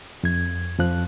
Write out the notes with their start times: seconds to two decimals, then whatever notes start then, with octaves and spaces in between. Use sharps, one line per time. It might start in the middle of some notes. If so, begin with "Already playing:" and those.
0.23 F2 G#6
0.79 F2 F3 F#6